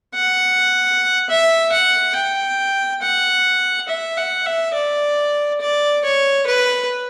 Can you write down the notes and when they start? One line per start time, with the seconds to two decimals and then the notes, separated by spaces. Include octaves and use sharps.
0.15 F#5
1.30 E5
1.72 F#5
2.16 G5
3.02 F#5
3.89 E5
4.17 F#5
4.46 E5
4.74 D5
5.61 D5
6.04 C#5
6.47 B4